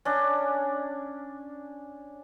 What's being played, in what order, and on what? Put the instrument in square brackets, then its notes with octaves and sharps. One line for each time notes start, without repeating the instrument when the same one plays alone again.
[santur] C#4 D4